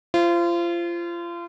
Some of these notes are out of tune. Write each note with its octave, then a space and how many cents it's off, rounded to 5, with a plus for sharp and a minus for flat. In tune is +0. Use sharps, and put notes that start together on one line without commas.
F4 -30 C5 +0